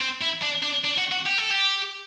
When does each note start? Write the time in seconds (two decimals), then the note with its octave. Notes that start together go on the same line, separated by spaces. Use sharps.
0.01 C4
0.22 E4
0.42 D4
0.63 D4
0.85 D4
0.98 F#4
1.12 F#4
1.26 G4
1.38 A4
1.51 G4